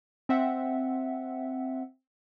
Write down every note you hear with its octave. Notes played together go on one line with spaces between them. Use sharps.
C4 E5 F#5